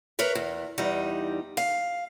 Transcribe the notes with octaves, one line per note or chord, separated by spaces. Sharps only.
A#4 B4 C#5 E5
E2
E2 G3 D#4
F5